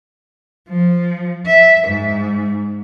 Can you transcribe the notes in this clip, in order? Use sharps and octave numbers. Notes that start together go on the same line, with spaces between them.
F3
E5
G#2